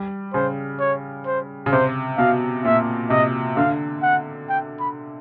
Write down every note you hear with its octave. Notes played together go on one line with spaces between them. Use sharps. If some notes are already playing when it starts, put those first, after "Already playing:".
Already playing: G3
C#3 C5
C#5
C5
C#3
C3 C5
B2 F5
A#2 E5
C3 D#5
D3 F5
F#5
G5
B5